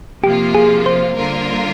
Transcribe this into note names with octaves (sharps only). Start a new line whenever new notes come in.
C3 F3 A#3 F4 G4
G#4
C5
D3 G3 A#3 F4 A#4